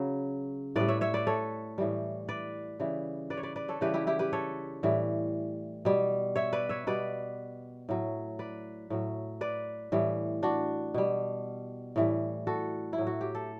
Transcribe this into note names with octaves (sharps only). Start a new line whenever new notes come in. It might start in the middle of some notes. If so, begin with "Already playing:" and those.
Already playing: C#3 F#3
A2 G3 B4 D5
C#5 E5
C#5 E5
B4 D5
A4 C#5
A2 E3 G3
B4 D5
C#3 E3 G3
B4 D5
C#5
B4 D5
B4 D5
A4 C#5
C#3 E3 G3 G4 B4
E4 G4
E4 G4
G4 B4
A4 C#5
A2 E3 G3
B2 G3
C#5 E5
B4 D5
C#5 E5
B2 G3 B4 D5
A2 F#3
B4 D5
A2 F#3
B4 D5
A2 E3 G3
D4 F#4
B2 G3
A2 E3 G3
F#4 A4
E4
A2 F#3
F#4
G4
A4